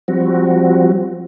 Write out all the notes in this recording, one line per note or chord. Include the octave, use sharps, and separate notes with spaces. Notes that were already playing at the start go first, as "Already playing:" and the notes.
F3 G3 C4 F#4